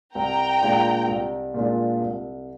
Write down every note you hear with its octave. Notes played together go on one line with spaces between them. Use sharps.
C2 G5 A#5
A#2 G#3 D4 F4
C2
A#2 G#3 D4 F4
C2